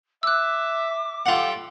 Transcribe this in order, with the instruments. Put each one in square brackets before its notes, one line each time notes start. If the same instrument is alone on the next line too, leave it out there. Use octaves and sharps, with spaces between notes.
[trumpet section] E5 [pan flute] D6 [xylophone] E6 F#6
[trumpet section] G3 A4 G5 [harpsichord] F4 F#5